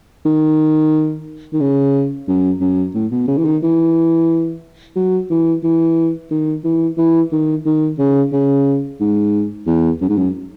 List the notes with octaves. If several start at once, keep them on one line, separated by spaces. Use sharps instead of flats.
D#3
D#3
C#3
F#2
F#2
A2
B2
C#3
E3
D#3
E3
F#3
E3
E3
D#3
E3
E3
D#3
D#3
C#3
C#3
G#2
E2
F#2
G#2
F#2